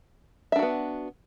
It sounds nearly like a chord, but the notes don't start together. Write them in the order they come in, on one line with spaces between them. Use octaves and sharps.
E5 D4 F#4 B3